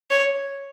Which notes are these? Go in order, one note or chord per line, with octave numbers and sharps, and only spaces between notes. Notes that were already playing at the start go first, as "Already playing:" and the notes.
C#5